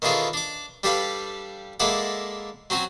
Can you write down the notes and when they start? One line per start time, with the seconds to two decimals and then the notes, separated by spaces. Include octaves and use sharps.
0.02 D#3 E3 C#4 F4 G#4 A4
0.33 D4 D6
0.83 G3 D4 G4 A4 B4 F5
1.80 G#3 A#3 E4 A4 D5 F#5
2.70 F#3 C4 C#4 F#4